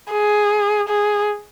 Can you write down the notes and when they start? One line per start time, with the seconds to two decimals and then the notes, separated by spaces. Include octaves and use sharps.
0.12 G#4
0.88 G#4